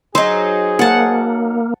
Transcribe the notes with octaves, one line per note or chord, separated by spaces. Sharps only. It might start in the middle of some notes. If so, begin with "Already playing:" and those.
F#3 D#4 G#4 C5
A#3 F#5 A5